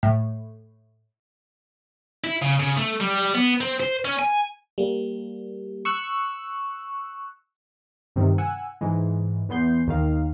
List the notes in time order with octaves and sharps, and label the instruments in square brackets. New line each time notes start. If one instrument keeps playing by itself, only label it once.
[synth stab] A2
[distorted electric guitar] E4
C#3
C#3
A3
G3
B3
C4
C5
C#4
G#5
[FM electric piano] G3 A#3
C#6 E6 F#6
[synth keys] G2 C3 D#3
F#5 G#5 E6
G#2 E3 G#3
E2 E3 B3 C6 G6 C7
D#2 D#3 F5